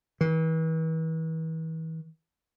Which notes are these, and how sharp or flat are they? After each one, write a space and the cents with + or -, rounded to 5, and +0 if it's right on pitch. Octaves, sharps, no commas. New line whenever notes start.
E3 -40